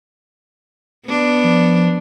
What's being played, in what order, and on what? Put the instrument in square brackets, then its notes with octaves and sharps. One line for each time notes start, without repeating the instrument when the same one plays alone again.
[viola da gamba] B3 D4
[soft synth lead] F3